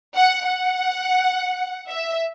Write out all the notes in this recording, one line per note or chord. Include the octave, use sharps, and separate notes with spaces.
F#5
F#5
E5